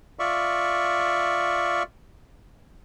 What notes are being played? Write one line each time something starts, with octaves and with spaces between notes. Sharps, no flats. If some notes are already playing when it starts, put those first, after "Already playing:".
F4 D5 E5 C#6